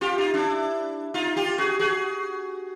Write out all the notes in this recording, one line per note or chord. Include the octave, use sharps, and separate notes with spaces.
F4 G4
D#4 F4
D4 E4
D#4 F4
F4 G4
F#4 G#4
F#4 G#4